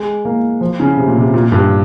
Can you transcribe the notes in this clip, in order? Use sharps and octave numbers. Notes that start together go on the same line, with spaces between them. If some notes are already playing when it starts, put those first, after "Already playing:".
Already playing: G#3
A#3
F3
C#3
C3
A#2
C3
A#2
G2